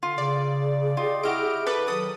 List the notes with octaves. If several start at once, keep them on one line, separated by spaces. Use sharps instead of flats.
D3 F4
C#3 G#4 D5
F4 G4 D#5
E4 F#4 G4 D#5 E5 F6 D7
A4 B4 D6
D#3 F#3 A4 B4 D#6